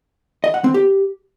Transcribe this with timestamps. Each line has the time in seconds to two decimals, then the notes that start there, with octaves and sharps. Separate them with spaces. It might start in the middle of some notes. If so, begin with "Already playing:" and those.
0.44 D#5
0.54 F#5
0.64 C4
0.74 G4